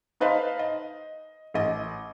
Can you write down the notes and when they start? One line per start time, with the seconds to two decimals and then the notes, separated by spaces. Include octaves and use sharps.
0.20 D#4 B4 C5 D#5 F5 A5
0.59 D#5
1.54 A1 D#5